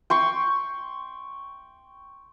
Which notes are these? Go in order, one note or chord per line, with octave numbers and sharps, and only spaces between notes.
G5 C6 C#6